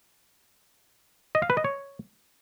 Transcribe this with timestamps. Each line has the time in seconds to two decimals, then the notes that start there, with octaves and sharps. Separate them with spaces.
1.35 D#5
1.42 F5
1.50 B4
1.57 D#5
1.65 C#5